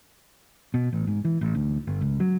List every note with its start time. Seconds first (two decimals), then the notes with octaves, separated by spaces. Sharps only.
0.74 B2
0.93 A1
1.07 G#2
1.25 E3
1.41 A1
1.55 D2
1.87 G1
2.01 C#2
2.20 F#3